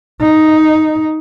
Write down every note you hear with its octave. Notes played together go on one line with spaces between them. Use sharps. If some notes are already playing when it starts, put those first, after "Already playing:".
D#4